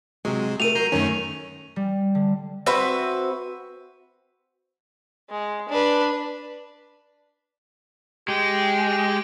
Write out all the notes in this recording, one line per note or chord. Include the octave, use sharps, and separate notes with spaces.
C3 F#3 G#3
A3 G4 A#4 D#7 F7
F#3 A#4 A#5 G6 C7
F#2 D#3 A3 C#4 C#5
G3
D3
C4 F#4 B4 E5
G#3
D4 B4
G#3 G4 G5